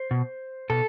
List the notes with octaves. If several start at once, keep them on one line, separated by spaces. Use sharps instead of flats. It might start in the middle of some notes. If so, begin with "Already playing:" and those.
Already playing: C5
B2
B2 A4